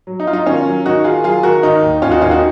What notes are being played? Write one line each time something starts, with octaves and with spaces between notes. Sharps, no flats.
F#3
D#4
F#3 F4
D#4
D#3 C#4 F4
F#3
D#3 D#4 F#4
D#3 F4 G#4
F#3 F4 G#4
D#3 F#4 A#4
D#3 D#4
D#2
D#2 C#4 F4
D#4 F#4
D#2 C#4 F4
D#4 F#4